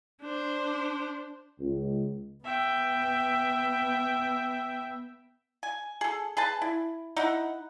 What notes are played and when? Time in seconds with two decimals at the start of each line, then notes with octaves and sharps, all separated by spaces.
0.21 D4 C5
1.60 C#2
2.44 B3 E5 G5
5.63 G#5
6.01 G#4 A4
6.37 G#4 B4 A5
6.62 E4
7.16 D#4 E4 F#5